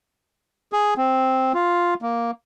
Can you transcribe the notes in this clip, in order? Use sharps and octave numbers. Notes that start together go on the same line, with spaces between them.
G#4
C4
F4
A#3